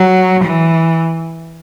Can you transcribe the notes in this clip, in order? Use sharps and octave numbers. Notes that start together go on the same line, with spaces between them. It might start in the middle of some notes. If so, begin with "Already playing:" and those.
Already playing: F#3
E3